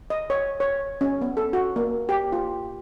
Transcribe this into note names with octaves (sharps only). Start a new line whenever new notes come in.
D#5
C#5
C#5
C#4
B3
A4
F#4
A#3
G4
F4